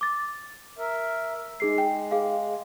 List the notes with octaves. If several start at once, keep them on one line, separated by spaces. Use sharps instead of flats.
D6 A6
A#4 E5
G#3 D#4 G#4 C7
G5
G#4 F5